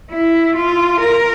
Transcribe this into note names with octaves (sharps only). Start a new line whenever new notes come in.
E4
F4
A#4